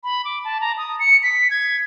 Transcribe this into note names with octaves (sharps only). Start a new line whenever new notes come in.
B5
D6
A5
A#5
D#6
C#7
B6
G#6